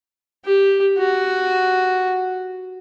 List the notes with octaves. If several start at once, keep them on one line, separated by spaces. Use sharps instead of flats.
G4
F#4